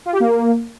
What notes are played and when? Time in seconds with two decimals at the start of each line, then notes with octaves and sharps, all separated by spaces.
0.06 F4
0.13 G4
0.20 A#3